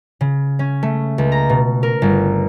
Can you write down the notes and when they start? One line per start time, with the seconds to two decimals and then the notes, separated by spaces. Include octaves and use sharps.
0.21 C#3
0.59 C#4
0.83 A3
1.18 C#2
1.32 A#5
1.49 B2
1.83 A#4
2.02 G1